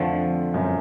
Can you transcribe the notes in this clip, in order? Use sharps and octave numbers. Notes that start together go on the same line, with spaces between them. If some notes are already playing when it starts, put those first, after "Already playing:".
Already playing: F2 D3 F3 A3
F#2